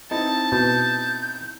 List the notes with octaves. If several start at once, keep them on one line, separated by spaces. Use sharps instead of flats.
C4 D#4 E4 A5
B2 G6